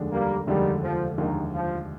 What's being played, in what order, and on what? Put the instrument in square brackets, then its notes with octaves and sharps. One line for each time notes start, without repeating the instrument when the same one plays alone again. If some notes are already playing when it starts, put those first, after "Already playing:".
Already playing: [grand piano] F1 D#2 D3 G#3 D4
[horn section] G3 A#3
[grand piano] F1 D#2 D3 G#3 D4 [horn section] D#3 G3
[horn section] F3
[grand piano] F1 D#2 D3 G#3 D4 [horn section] D#3
[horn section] F3